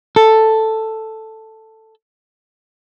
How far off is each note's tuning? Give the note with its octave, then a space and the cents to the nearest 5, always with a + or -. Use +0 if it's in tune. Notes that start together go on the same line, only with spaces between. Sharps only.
A4 +5